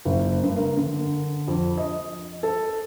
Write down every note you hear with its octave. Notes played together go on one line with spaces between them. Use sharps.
F#1
G2
A#4
D3
F2
D#5
A4